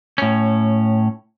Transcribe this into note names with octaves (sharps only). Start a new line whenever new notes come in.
A2 C#4